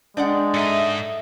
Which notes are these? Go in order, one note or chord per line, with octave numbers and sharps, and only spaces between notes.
G#3 D4 D5 F#5 G5 G6
G#2 A4 D#5 E5 A#5